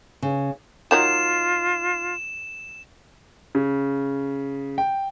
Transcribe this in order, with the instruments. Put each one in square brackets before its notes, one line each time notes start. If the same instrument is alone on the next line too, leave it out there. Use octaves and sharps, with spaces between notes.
[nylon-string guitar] C#3
[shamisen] D#3 F#3 D#4 [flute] F4 [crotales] E7
[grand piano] C#3
G5